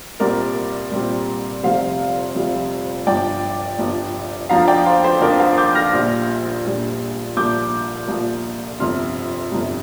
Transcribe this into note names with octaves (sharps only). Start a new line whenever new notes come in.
C2 A#2 G3 C4 A#4 D5
C2 A#2 G3 C4
F1 F2 C3 G3 C5 F5
F1 F2 C3 G3
G1 G2 F3 D5 G5
G1 G2 F3
F2 F3 D4 F5 A#5
D5 G5
C5 F5
C5
F2 F3 D4 A#4 D5
C5 F5
D6 G6
F6 A#6
A#1 A#2 G3
A#1 A#2 G3
C2 A#2 F3 D6 G6
C2 A#2 F3
G1 F2 C3 C6 F6
G1 F2 C3